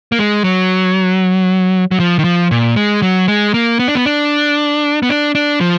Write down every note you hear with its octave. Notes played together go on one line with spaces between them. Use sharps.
A#3
G#3
F#3
F#3
F3
D#3
F3
A#2
G#3
F#3
G#3
A#3
B3
D4
B3
D4
B3
D4
D4
F3